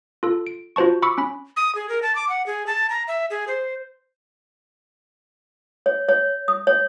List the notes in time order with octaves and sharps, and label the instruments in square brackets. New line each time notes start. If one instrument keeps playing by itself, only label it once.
[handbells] F4 A4
D7
F4 F#4 C5 A5 C#6
B5 C#6 D6 E6 C#7
C#4 B5
[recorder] D#6
G#4
A#4
A5
D6
F#5
G#4
A5
A#5
E5
G#4
C5
[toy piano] C#5
C#5
D#6
C#5